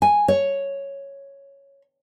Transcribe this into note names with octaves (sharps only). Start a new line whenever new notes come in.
G#5
C#5